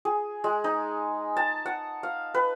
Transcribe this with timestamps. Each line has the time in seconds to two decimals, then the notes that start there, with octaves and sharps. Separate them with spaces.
0.05 G#4
0.44 G#3
0.64 D#4
1.37 A5
1.66 F#5
2.03 F5
2.34 B4